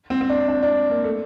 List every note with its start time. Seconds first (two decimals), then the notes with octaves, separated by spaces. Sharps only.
0.10 C4
0.21 C4
0.29 D4
0.49 D4
0.63 D4
0.90 A#3
1.04 A3